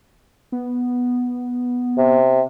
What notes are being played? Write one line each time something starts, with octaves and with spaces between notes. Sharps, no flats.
B3
C3